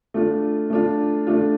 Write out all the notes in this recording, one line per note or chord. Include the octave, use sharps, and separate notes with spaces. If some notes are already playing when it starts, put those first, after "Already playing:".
A3 D4 F4
A3 D4 F4
A3 D4 F4